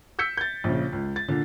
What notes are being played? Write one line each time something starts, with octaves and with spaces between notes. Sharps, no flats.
E6 G6 B6 C#7
G6 A6
A#1 C#3
C#2
A6
A#2 D3